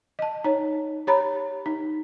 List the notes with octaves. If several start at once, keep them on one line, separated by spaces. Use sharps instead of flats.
D#5 A5
D#4 C#5
G4 C#5 A#5 B5
D#4